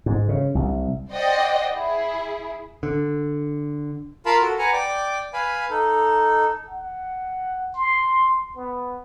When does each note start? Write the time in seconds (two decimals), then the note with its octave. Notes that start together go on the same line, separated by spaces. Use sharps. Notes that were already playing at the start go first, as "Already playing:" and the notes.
0.06 G#2
0.29 C#3
0.55 C2
1.10 C5 D5 D#5 F#5 G5
1.73 E4 G#4
2.83 D3
4.26 F4 A#4 F5 A5 B5
4.41 F#4 A4
4.59 B4 F#5 G#5 A#5
4.73 D5 G5 D6
5.33 B4 F5 G#5 B5
5.70 D#4 A4
6.68 F#5
7.75 C6
8.56 B3